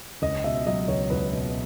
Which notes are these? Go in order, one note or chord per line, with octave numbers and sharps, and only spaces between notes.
C#2 D#5
B2 E5
F#3 D#5
C#2 C#5
C#2 B4
B2